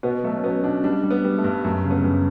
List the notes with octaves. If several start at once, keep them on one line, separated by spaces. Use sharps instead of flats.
B2 B3
F#3 A3
C#4
F#3 B3
B2 D4
G3 D4
G3
B3
G3
A3
G2
F#2 A3
C#3
B3
F#2